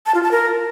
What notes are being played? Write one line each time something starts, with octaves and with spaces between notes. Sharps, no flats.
A5
F4
A5
A#4